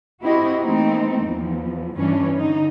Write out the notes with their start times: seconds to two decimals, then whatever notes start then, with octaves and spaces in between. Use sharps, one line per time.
0.23 C4 E4 F#4 G4 D#5
0.63 E3 A3 A#3 C4 D#4
1.22 E2 F3
1.96 G2 E3 C#4 D4
2.36 D3 D#4